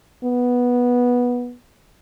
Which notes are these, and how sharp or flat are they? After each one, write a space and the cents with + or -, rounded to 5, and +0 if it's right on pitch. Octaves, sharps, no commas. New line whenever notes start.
B3 -10